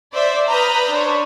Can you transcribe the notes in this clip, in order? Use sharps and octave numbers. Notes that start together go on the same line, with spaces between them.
C5 D5 E5
B4 A#5 B5 D#6 F6 G6
D4 C5 C#5